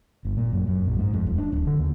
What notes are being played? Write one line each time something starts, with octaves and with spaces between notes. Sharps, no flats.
G1
A#2
F#2
F#2
A#1
G#2
F2
D#1
D4
D1
D3
D#2